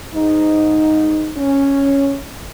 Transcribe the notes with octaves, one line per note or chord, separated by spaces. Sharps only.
G#2 D#4
C#4